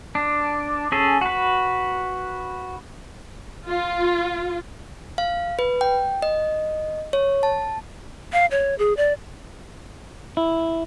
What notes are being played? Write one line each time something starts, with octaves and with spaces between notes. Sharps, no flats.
D4
C#4 G#4 A4
F#4 B4
F4
F5
B4
G5
D#5
C#5
A5
F5
C#5
G#4
D5
E4